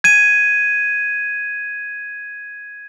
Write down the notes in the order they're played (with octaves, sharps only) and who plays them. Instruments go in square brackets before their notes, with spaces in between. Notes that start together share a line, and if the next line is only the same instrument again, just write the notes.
[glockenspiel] G#6 D#7